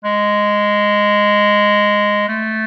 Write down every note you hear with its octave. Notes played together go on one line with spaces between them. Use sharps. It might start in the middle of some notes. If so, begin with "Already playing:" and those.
G#3
A3